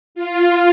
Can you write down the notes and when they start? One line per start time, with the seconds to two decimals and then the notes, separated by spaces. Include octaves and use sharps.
0.15 F4